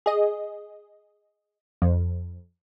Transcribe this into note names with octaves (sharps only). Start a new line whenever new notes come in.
G#4 D#5
F2